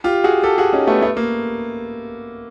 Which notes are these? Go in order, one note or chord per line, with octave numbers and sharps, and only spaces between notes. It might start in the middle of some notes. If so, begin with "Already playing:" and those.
F4 G4
F#4 G#4
G4 A4
F#4 G#4
C#4 D#4
A3 B3
A3 B3
A#3